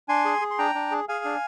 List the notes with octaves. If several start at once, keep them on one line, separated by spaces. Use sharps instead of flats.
D4 G#5 C6
G#4
G#4
C6
D4 G5 A#5
D4
G#4
G#4 F5 G#5
D4